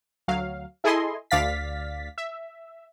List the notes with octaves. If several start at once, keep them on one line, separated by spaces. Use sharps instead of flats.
D2 F#3 F5
E4 G#4 A4 D#5 G#5 C6
D2 D5 F5 A6 B6
E5